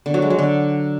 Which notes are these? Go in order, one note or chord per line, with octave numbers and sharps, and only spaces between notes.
D3
F#3
G#3
F#3
D3